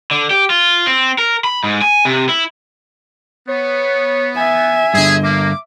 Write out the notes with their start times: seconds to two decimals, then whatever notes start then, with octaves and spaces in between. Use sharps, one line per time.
0.11 D3
0.31 G4
0.50 F4
0.87 C4
1.18 A#4
1.44 B5
1.64 G#2
1.82 G#5
2.05 C3
2.29 E4
3.49 B3 C#5
4.37 E5 G#5
4.94 G2 D3 G#4
5.24 A#3 D6